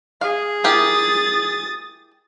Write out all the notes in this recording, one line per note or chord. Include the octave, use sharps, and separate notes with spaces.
G#4 F5
E4 G4 A#4 D#6 A6